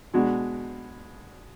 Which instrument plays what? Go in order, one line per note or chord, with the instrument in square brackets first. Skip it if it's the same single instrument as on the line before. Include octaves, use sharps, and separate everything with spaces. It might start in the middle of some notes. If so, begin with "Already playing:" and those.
[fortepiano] B2 G#3 D4 F#4